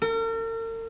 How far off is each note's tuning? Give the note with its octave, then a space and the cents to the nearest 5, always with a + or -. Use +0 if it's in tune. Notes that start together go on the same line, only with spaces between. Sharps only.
A#4 -45